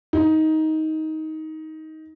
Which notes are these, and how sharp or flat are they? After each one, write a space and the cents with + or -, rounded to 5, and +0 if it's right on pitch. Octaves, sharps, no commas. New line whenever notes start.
D#4 +15